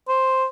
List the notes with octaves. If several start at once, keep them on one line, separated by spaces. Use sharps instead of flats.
C5